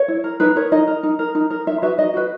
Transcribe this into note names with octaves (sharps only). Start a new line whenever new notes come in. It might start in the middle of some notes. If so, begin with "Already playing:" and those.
Already playing: C#5
E4
A#4
D#4 B4
A#4 C#5
D#4 D#5
A#4
D#4
A#4
D#4
A#4
D#4 E5
F#4 B4 E5
D#4 D#5
F#4 B4